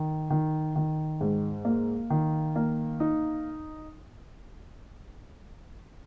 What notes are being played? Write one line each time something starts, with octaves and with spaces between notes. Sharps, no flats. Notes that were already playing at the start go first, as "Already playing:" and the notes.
Already playing: D#3
D#3
D#3
G#2
A#3
D#3
A#3
D#4